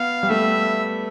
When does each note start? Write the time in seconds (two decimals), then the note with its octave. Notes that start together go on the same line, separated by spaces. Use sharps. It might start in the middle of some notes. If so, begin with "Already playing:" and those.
Already playing: B3 F5
0.23 G3
0.29 A3 E5